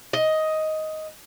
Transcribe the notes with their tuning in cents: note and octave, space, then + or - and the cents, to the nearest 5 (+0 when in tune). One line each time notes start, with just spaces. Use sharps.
D#5 +10